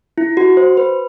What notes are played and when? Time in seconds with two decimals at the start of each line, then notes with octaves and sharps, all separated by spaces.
0.18 E4
0.37 F#4
0.57 C5
0.77 B4